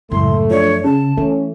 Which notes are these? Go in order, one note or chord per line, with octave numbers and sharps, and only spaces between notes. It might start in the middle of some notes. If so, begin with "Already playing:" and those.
C#2 F#2 A2 A3 C6
F3 D4 C#5
C#3 A5
E3 A3 C#4